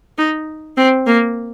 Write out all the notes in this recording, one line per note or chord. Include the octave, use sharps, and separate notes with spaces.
D#4
C4
A#3